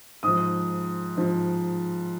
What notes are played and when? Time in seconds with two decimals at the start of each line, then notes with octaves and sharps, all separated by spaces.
0.23 G#2 F3 D#6
1.17 G#2 F3